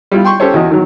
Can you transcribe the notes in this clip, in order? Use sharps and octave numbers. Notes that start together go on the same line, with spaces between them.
G3 E4 F4
G5 C6 C#6
C#4 G4 A4 C5 C#5
E2 F#4 D#5
D#3 F#3